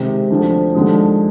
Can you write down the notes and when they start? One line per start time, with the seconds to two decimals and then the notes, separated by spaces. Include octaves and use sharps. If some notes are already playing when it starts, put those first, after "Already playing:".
Already playing: C3 D#3 G#3 C4
0.30 D2 D3 F3 C4
0.74 D#2 D3 F3 G#3